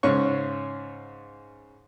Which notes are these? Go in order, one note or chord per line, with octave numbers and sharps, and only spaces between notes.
G#2 C#3 C#4 C#6